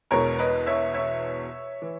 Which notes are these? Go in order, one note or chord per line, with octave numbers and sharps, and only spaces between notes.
E1 E2 B2 G#3 A#4 C#5
B4 D#5
C#5 E5
C#5 E5
E3